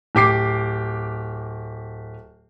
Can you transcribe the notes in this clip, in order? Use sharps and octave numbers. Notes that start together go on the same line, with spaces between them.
D1 G4 D6 C7